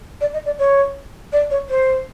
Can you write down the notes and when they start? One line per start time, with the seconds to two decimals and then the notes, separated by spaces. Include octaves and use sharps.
0.20 D5
0.33 D#5
0.45 D5
0.58 C#5
1.32 D5
1.50 C#5
1.69 C5